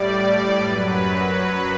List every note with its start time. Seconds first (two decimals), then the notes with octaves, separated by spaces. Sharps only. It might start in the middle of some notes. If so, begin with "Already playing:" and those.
Already playing: A2 G3 D5
0.62 F#2 F#3 B4
1.09 B4